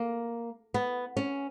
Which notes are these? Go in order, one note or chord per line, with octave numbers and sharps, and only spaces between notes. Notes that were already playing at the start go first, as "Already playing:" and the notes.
Already playing: A#3
B3
C#4